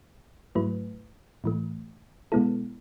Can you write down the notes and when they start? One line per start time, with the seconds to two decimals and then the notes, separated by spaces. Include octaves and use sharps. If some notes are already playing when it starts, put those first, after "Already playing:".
0.55 G#2 F#3 A3 E4 B4
1.44 A2 E3 A3
2.32 B2 G#3 B3 E4 A4